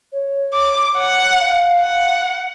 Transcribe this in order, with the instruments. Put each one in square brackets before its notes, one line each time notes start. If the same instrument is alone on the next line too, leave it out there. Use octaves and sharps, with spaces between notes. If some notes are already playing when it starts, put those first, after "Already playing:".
[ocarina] C#5
[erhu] D6
F#5
[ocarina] F5
[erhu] F#5